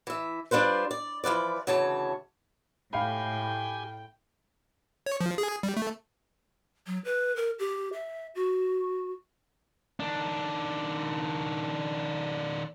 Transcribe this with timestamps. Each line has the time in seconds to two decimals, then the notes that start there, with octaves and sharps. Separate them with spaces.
0.07 E3 E5
0.51 G3 D4 F4 B4 C5
0.91 D5
1.24 E3 F3 B4 D5
1.67 D2 C#3 E3 C#5 A5
2.93 A2 G4 F5 G5 G#5 B5
5.06 C#5
5.21 F3
5.38 G#4
5.63 G3
5.77 A3
6.87 F#3
7.05 B4
7.36 A#4
7.59 G4
7.93 E5
8.35 F#4
10.00 D#3 D4